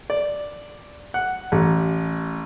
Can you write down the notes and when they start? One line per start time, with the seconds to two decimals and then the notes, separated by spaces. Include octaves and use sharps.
0.10 D5
1.14 F#5
1.52 A1